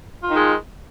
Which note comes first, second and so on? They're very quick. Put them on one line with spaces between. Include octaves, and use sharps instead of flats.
F4 D#3 D#4 G#3